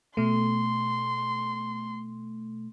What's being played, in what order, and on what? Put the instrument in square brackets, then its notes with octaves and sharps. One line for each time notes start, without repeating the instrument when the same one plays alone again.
[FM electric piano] B2 A3 [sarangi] C6